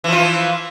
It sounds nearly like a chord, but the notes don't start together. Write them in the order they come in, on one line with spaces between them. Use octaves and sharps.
E3 F3 F4